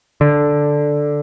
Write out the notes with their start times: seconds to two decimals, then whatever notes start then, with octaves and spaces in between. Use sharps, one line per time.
0.21 D3